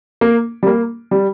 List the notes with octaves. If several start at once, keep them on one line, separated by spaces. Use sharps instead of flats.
A#3
G3
A#3
G3